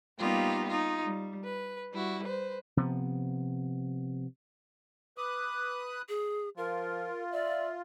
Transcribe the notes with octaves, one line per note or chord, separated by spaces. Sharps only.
G3 A#3 B3 D#4 F4 G4
D#4 F4
G3
B4
G3 E4 F#4
B4 C5
C3 F3 B3
B4 D6 D#6 F#6
G#4
F3 F4 A#4
D5 E5